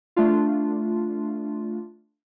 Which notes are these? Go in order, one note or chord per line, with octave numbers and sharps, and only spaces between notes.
A3 D4 F4